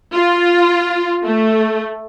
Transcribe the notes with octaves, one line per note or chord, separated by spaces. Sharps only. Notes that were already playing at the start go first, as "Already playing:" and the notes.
F4
A3